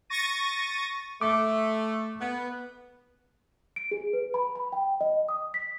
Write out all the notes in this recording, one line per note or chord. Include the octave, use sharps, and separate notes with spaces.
C#6 A6 A#6 D#7
A3 D6
B3
D7
G#4
B4
B5
B5
G5
D#5
D#6
B6